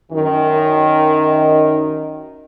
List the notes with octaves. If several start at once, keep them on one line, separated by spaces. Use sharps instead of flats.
F#2 D#3